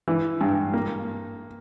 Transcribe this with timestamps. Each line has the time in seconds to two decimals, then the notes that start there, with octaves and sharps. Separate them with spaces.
0.08 E3
0.41 G2
0.73 A#3